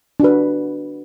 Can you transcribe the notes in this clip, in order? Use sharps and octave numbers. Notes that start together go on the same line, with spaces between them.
D4 F#4 B4